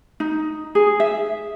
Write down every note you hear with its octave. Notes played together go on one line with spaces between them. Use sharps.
D#4
G#4
E5